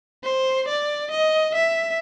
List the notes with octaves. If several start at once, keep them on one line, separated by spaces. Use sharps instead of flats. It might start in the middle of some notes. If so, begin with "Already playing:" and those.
C5
D5
D#5
E5